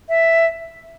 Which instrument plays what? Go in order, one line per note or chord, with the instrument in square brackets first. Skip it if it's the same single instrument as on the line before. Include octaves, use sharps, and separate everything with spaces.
[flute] E5